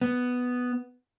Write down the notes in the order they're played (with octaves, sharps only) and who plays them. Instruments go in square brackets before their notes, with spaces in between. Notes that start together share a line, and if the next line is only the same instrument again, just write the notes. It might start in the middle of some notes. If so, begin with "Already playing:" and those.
[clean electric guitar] B3